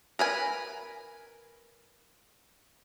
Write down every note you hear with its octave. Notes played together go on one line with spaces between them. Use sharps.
A#4 B4 G#5